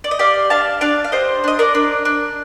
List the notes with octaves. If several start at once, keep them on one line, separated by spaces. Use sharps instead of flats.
D5
D#5
G4 D5 F5
D4 F5 A5
D4 D5 F5
F5
G4 C5 D#5
D4 D#5
A#4 D5
D4
D4